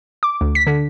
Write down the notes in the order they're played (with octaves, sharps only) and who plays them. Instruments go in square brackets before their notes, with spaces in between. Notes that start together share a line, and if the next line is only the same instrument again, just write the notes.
[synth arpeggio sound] D6
D2
B6
D3